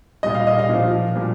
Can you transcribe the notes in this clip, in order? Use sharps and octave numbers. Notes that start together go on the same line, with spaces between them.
A#2 G3 D#5
F5
D#5
F5
A#2 F3
A#2 G3